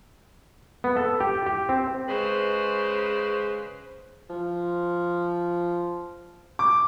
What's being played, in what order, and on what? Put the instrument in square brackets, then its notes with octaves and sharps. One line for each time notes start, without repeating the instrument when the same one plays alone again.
[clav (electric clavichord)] B3
A4
G4
G4
C4
[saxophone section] C#3 G#3 B4 C5
[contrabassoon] F3
[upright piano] D6